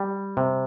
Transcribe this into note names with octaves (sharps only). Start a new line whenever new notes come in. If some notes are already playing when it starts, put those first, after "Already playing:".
Already playing: G3
C3